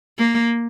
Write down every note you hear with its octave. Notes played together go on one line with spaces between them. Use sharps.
A#3